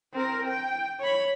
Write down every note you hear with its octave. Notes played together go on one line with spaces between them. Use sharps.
C4 A#4
G5
C#5 B5